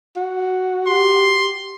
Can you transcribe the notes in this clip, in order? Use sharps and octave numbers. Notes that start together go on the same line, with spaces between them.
F#4
G4 C6